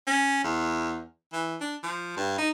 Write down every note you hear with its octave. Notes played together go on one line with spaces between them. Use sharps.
C#4
E2
E3
D4
F3
G2
D#4